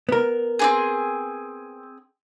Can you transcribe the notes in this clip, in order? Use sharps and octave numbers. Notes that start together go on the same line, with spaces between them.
B3 A#4
C4 D4 G#4